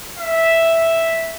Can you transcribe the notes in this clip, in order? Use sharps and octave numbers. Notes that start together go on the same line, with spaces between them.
E5